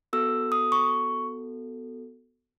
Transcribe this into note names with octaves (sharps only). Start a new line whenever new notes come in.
B3 F#4 A4 E6
D#6
C#6